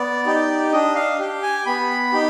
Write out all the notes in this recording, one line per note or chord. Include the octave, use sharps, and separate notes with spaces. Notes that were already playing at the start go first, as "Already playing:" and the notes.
Already playing: B3 D5
D#4 G4
D4 D#5
F5
G4
G#5
B3 B5
D#4 G4